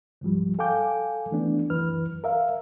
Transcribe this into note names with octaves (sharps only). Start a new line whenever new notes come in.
C#2 G#2 F3 G3
A4 F5 G5 G#5 D6 G6
E3 A3 B3 D4
C#2 F#2 E3 B4 F6
A#4 E5 F5